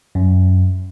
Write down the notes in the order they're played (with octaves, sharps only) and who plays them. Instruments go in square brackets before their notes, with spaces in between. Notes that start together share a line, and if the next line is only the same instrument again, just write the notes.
[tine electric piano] F#2